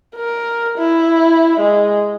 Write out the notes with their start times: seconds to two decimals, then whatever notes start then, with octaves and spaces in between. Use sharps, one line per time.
0.16 A#4
0.78 E4
1.60 G#3